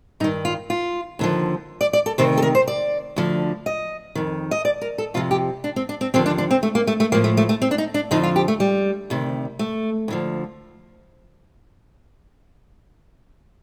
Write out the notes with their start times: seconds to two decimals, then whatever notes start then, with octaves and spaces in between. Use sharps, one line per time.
0.20 G2 D#4
0.24 D#3
0.45 F4
0.70 F4
1.19 D#2 D3 F3
1.81 D5
1.93 D5
2.06 A4
2.18 D2 C3 D#3 C5
2.38 A4
2.42 A#4
2.55 C5
2.68 D5
3.16 D2 D3 F3
3.66 D#5
4.15 F2 D#3
4.51 D#5
4.65 D5
4.81 A#4
4.98 A4
5.14 F2 C3 F3 F4
5.31 G4
5.64 D4
5.76 C4
5.89 D4
6.01 C4
6.14 D#2 D3 F3 C4
6.26 D4
6.38 D4
6.51 C4
6.63 A3
6.75 A#3
6.87 A3
7.00 A3
7.12 A2 F3 A#3
7.24 A3
7.37 A3
7.49 A3
7.62 C4
7.71 D4
7.78 D#4
7.94 D4
8.11 F2 D3 F3 D#4
8.23 F4
8.36 G4
8.48 A3
8.60 G3
9.10 D2 C3 D#3
9.59 A3
10.08 D2 D3 F3